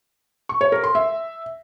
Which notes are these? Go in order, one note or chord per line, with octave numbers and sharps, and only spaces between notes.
C#6
C#5
A#4
C6
E5